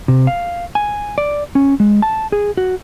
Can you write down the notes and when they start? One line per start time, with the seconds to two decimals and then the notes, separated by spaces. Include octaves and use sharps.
0.08 C3
0.27 F5
0.75 G#5
1.18 D5
1.55 C#4
1.80 G#3
2.02 A5
2.32 G#4
2.57 F#4